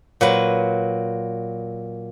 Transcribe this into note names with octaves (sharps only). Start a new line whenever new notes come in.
A#2 F#3 B4